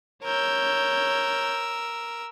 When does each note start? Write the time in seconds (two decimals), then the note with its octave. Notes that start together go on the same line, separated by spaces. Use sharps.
0.24 A#4 C#5 E6 G6